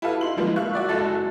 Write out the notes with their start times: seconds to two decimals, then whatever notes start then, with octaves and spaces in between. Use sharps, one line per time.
0.02 E4 F#4 G4 A4 B4 F5
0.21 D#4 C6 F#7
0.36 D3 E3 F3 G3 G#3 A#3
0.56 E5 F5 C#6 F#6
0.73 F#4 D5 E5
0.88 F#1 G#3 F#4 A4 A6